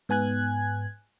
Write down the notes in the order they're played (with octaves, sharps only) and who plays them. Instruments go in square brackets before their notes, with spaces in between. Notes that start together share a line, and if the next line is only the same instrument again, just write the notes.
[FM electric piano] G#2 B3 G#5 F#6 G#6